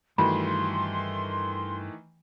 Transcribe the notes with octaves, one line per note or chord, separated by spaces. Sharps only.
G2 D#3 E3 A3 F#4 B5 C6